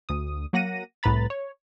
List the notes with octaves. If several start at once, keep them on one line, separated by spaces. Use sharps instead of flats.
D2 D#6
F#3 A#3 F#5 A#6 D#7
C2 A2 B4 A#5 B5 A6
C#5